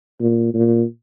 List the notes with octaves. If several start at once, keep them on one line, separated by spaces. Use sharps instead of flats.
A#2
A#2